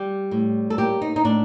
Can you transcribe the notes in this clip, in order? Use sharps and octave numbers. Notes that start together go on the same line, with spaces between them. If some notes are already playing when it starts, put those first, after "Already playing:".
Already playing: G3 G4
A2
A4
A#3 G4
D#4
D#4
A2 D4